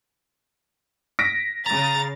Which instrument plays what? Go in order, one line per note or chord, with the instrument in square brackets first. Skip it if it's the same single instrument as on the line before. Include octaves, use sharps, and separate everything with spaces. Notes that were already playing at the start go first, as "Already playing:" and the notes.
[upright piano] A#6 B6 D7
[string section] C#3 A6 [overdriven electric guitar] A#5